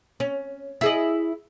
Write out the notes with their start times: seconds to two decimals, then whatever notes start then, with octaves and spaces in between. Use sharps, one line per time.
0.20 C#4
0.81 E4 G#4 D#5